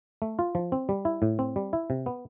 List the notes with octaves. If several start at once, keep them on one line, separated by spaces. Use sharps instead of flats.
A3
F4
F3
C4
G3
E4
A2
C4
G3
E4
C3
B3